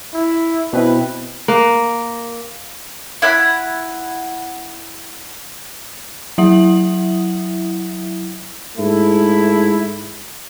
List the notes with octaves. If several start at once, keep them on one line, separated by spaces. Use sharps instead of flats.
E4
B2 C4 E4 B4
A#3
E4 F#5 B5
F#3 E4 E5 F#5 D#6 F#7
G#2 A3 E4